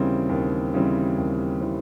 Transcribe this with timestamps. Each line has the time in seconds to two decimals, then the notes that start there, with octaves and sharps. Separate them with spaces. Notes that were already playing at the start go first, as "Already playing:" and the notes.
Already playing: D#2 C#3 E3 G3 C4
0.29 D#2
0.74 C#3 E3 G3 C4
1.18 D#2
1.61 C#3 E3 G3 C4